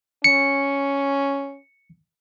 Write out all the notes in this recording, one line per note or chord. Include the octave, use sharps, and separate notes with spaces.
C#4 C#7